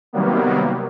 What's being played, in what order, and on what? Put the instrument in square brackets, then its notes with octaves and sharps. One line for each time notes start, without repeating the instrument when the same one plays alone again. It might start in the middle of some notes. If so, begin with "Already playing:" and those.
[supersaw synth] C3 D#3 F#3 G3 A#3 B3